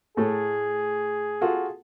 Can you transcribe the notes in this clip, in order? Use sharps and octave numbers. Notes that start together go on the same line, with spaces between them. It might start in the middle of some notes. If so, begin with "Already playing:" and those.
A2 A3 G#4
F4 F#4 A4